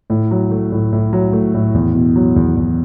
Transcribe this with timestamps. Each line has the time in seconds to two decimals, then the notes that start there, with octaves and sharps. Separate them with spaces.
0.10 A2
0.31 F#3
0.51 A3
0.72 A2
0.92 A2
1.13 F#3
1.33 A3
1.54 A2
1.74 E2
1.95 B2
2.16 F#3
2.36 E2
2.57 E2